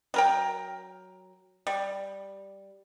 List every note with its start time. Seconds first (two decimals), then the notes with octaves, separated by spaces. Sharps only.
0.14 F#3 A#4 G5
1.67 G3